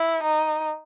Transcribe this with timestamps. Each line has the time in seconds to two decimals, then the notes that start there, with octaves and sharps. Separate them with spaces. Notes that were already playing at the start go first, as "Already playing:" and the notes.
Already playing: E4
0.23 D#4